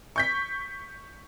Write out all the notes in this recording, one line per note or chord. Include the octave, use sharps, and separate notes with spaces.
C#6 G6 B6